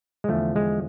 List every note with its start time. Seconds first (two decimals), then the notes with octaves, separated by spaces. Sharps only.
0.24 G#3
0.28 E2 D3 F3 A3
0.56 G#3